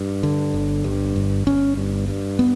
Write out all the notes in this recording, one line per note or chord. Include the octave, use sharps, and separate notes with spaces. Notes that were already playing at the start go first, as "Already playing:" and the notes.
Already playing: G2
D3
G1
G2
G1
G1 C#4
G2
G2
B3